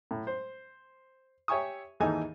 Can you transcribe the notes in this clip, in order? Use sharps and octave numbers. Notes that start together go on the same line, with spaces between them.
A2
C5
G4 C#5 E5 G#5 C#6 D#6
D#2 G#2 E3 D#4 A4 G#5